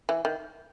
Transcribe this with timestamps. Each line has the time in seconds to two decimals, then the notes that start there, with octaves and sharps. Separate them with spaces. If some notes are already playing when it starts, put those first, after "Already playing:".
0.09 E3
0.25 D#3